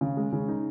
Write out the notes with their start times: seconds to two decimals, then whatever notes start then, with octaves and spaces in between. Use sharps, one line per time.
0.01 C#3
0.17 G#3
0.33 C#3
0.48 D#4